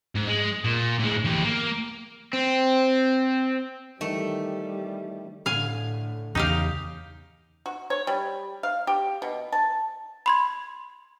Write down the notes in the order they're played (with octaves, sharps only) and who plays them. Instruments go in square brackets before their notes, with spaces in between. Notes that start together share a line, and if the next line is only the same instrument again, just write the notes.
[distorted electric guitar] G#2
G#3
A#2
A2 G#3
E3 G4
A#3
[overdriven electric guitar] C4
[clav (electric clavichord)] D#3 E3 [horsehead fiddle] G3 [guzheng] A3
[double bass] A2 D3 [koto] F5 G#5
[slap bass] E2 [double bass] C#3 [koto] D#4 G4 F5
[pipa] F#4
C#5
G3
F5
G4
B2
A5
[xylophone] B5 C6 G#6